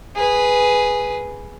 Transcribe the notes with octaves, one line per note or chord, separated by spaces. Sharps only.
G#4 B4